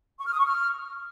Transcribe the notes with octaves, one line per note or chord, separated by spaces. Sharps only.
C#6
F6
D#6
C#6
F6